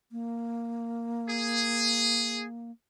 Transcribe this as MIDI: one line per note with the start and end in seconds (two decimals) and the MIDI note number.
0.12 2.71 58
1.30 2.44 68